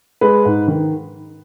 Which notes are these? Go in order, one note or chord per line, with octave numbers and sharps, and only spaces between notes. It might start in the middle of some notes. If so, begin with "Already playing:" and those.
G#3 B4
G#2
D#3